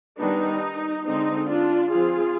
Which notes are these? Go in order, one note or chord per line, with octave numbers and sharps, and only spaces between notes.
D#3 G3 B3 D4 D#4
D3 G#3 C4 D#4
D4 F4
F3 C4 F4 G#4